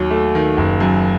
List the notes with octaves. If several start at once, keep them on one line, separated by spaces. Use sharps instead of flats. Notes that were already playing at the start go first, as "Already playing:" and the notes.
Already playing: D#2 F#3
A3
D#3
F#1
F#2